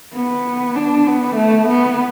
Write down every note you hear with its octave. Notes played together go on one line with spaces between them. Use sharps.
B3
D4
B3
A3
B3